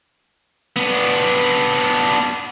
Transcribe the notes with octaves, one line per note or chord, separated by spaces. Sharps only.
B3 D4